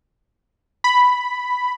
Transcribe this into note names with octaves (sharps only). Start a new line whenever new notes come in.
B5